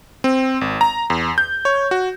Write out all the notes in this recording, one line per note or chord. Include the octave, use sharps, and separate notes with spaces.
C4
G#1
A#5
E2
G6
C#5
F#4